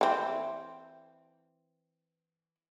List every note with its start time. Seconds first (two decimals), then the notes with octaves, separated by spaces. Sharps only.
0.01 E3 C4